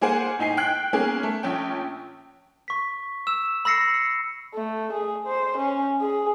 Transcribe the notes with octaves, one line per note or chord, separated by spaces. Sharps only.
A#3 G#4 C5 F#5 G#5
A2 D#4 G#5 C7
G5 F#6
A#3 B3 C#4 G#4 A#4
A3
A#1 C#4 G5
C#6 B6
E6 E7
B5 E6 A#6 C7 C#7
A3
G#4
C5
C#4
G#4